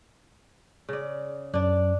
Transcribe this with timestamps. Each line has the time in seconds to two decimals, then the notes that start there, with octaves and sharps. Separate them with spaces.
0.89 C#3 D5
1.54 F#2 D4 D5